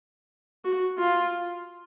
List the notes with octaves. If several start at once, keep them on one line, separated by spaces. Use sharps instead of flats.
F#4
F4